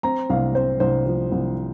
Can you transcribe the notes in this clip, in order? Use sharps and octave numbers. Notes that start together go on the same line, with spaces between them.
C4 A#5
C2 F5
C4 C5
C2 C5
F3
C2